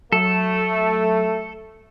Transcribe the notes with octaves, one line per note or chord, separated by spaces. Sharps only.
F#3 A3 A4